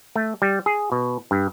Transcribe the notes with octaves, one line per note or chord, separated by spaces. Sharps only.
A3
G3
G#4
B2
G2